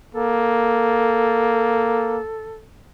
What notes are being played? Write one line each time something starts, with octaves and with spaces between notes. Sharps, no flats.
A#3 A4